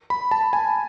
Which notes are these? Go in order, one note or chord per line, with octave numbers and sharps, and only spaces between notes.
B5
A5
G#5